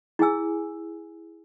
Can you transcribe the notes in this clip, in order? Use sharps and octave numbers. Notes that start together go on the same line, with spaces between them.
E4 G#4 G#5 E6